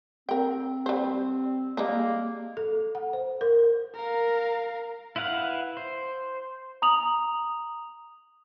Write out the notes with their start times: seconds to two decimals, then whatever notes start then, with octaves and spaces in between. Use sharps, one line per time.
0.29 C4 A#4 G5
0.86 G3 C5
1.77 G3 G#3 A#3 D#4
2.57 A4
2.95 F#5
3.13 C5
3.41 A#4
3.95 A#4 F5
5.16 E4 B4 F5 F#5
5.77 C5
6.82 A#5 D#6 F7 F#7